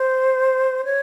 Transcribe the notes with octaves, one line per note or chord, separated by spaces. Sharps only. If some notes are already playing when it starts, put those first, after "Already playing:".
Already playing: C5
C#5